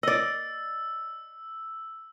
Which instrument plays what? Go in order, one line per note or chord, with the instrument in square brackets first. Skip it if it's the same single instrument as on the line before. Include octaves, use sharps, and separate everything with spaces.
[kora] D5 D#5 [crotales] E6